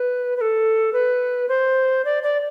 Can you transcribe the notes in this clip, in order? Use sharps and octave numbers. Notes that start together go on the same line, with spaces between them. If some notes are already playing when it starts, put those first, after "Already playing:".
Already playing: B4
B4
A4
B4
C5
D5
D5